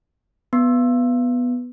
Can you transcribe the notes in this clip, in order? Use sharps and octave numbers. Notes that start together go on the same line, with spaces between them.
B3